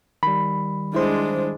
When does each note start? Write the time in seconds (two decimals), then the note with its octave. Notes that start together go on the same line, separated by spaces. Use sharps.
0.23 D#3 G3 B5
0.94 G#3 D4 E4 C5